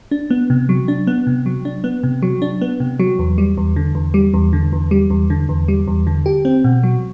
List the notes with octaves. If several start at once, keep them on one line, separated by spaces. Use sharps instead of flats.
D4
B3
C3
F#3
D4
B3
C3
F#3
D4
B3
C3
F#3
D4
B3
C3
F#3
E2
G3
E2
D3
E2
G3
E2
D3
E2
G3
E2
D3
E2
G3
E2
D3
G4
C4
B2
F#3